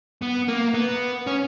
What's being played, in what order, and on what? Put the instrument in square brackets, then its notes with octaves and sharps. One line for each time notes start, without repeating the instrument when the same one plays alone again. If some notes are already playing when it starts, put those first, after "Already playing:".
[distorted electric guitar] B3
A#3
B3
C#4